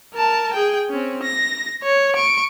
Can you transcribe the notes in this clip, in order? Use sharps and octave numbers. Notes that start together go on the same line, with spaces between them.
A#4 A5
G#4 G5
C4 C#4
A#6
C#5
C#6 D7